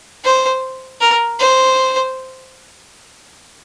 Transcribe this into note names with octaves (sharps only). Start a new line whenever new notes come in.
C5
A#4
C5